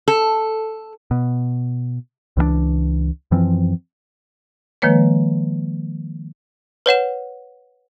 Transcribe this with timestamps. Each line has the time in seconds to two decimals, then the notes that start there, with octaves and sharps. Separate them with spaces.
0.08 A4
1.11 B2
2.37 C#2 E3 G3 D4
3.31 F#2 E3 F3 C4
4.82 D#3 F3 G#3 A#3 B4 C#5
6.86 B4 C#5 F#5 E7